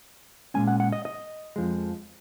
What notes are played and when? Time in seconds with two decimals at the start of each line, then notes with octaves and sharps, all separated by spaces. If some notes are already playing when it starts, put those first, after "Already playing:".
0.54 A#2 G#3 C#4 G#5
0.67 F#5
0.80 F#5
0.92 D#5
1.05 D#5
1.56 F2 F3 G#3